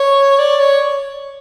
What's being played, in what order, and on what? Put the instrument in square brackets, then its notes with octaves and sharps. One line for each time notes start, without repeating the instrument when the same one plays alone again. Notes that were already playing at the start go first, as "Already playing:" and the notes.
Already playing: [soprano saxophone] C#5
D5
C#5